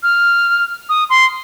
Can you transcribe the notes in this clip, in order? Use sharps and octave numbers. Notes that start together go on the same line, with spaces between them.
F6
D#6
C6